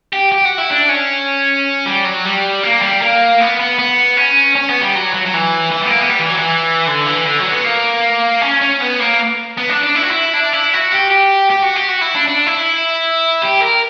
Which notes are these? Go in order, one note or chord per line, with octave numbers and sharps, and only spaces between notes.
G4
G4
F#4
E4
D4
C#4
G3
F#3
G3
A#3
G3
A#3
B3
B3
B3
C#4
C#4
B3
G3
F#3
F#3
F#3
E3
E3
G3
B3
A#3
B3
G3
E3
F#3
E3
D3
E3
D3
F#3
B3
A#3
C#4
C#4
B3
A#3
B3
D4
D4
E4
F#4
E4
D4
E4
F#4
G4
G4
G4
F#4
G4
F#4
E4
D4
D4
E4
G4
A#4